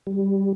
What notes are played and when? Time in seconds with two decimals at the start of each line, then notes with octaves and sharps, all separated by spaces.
0.07 G3